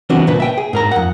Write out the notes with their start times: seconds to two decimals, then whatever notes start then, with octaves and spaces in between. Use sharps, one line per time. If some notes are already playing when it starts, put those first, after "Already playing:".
0.10 E3 B3 C4 D4 F#4
0.27 C2 A#2 B4
0.40 E5 G5
0.58 G#4
0.73 G#2 A#4 A#5
0.91 F2 F#5